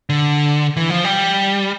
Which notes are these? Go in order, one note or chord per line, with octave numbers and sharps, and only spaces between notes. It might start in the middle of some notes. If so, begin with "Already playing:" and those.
D3
E3
F3
G3